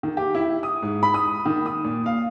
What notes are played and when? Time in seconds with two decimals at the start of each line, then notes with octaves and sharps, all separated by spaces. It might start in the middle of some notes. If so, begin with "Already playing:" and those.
0.03 D#3
0.17 G4
0.35 E4
0.63 D#6
0.82 G#2
1.03 B5
1.14 D#6
1.46 D#3
1.66 D#6
1.84 A#2
2.06 F5